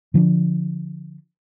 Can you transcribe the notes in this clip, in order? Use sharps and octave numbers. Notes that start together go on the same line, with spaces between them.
D3 F3 C4 D4